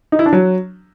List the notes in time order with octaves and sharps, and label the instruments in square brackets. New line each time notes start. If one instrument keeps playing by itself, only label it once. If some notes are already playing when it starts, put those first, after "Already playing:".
[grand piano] D#4
E4
D4
F#3